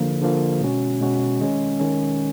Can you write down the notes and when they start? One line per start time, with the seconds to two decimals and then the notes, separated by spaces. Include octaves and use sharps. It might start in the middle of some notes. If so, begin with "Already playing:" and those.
Already playing: D3 F3 A#3
0.22 D3 F3 A#3
0.61 B2 G#3 C#4 F#4
1.01 B2 G#3 C#4 F#4
1.40 D#3 G#3 C#4
1.80 D#3 G#3 C#4